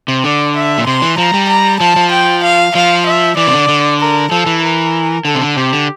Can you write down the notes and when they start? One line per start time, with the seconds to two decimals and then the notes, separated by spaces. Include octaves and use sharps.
0.08 C3
0.24 D3 D5
0.56 E5
0.78 A#2
0.86 C3 C6
1.02 E3
1.18 F3 A#5
1.34 G3
1.49 A#5
1.80 F3 A5
1.96 F3
2.11 G5
2.44 F5
2.75 F3 F5
3.06 E5
3.37 E3 D5
3.47 C3
3.53 D3
3.68 D3
4.00 A#4
4.31 F3 A4
4.46 E3
4.62 A#4
5.25 D3 A4
5.35 C3
5.41 D3
5.57 C3 G4
5.73 D3